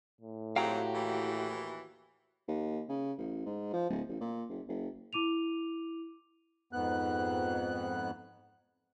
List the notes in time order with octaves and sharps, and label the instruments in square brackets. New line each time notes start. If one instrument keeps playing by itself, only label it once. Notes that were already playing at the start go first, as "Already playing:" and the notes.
[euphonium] A2
[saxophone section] F2 G#2 F#3 [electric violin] F#4 G4 [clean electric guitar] F5 G5 A#5
[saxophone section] D#2 E3
[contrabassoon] D#2
C#3
A1
G#2
F3
D1
A1
A#2
F#1
F#1
[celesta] E4 D6 D#7 F7
[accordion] F2 G#2 B3 F#6